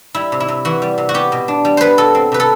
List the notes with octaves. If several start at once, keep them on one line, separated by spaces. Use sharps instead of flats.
G3 E4
C3
E4
C3
E3 F#4
G3
C3
F#4
B3 G4
B2
D4
G3
B3 B4 C5
B2 A4
C4
C3 B4
A4